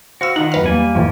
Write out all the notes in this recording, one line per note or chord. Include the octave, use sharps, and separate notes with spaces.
F#4 C5 F5 E6
D#3 D#4 F4 F#5
F#2 B4 F6
E2 G3 A#3 G#5
F2 A2 E3 F3